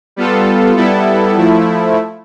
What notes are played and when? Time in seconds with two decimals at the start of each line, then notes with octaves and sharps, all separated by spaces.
0.16 G3 B3 F4 A4
0.76 G3 B3 E4 A4
1.36 F3 A3 E4